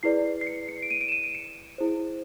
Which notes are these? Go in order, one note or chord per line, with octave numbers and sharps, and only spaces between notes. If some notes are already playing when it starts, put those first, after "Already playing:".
E4 G#4 B4 D5 C7
C7
C#7
C#7
D7
D#7
D7
E7
D#7
D7
C#7
E4 G#4 C5